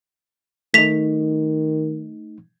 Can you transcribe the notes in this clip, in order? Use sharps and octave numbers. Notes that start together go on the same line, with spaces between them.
D#3 A3 D#4 B6 F7